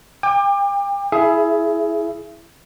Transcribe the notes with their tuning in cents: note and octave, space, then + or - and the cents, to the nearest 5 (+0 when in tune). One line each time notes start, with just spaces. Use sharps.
G5 +40 D6 +25
E4 +0 G#4 +20 E5 +25